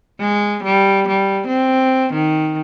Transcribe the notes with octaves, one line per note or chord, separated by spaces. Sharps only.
G#3
G3
G3
C4
D#3